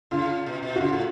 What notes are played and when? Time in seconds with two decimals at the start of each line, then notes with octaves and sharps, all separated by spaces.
0.11 C#3 F4
0.46 B2
0.63 B2
0.76 F#4
0.80 C#3 F4
0.92 A2